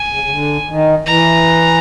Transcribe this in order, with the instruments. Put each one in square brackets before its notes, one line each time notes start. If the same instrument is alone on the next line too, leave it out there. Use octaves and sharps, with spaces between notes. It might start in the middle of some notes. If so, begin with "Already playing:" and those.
Already playing: [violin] G#5
[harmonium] C#3
C#3
D3
D#3
[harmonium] E3 [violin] A#5